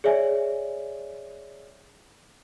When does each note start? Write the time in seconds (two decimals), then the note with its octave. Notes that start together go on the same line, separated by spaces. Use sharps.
0.04 G#4 C#5 D5 E5 G#5